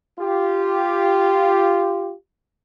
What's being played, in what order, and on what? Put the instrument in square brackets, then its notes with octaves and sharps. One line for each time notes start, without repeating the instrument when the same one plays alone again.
[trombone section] F4 G4